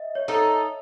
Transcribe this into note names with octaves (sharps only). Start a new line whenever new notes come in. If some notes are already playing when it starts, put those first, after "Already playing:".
Already playing: D#5 E5
C#5
D#4 A4